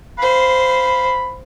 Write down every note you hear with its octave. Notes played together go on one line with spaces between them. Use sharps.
C5 F5 B5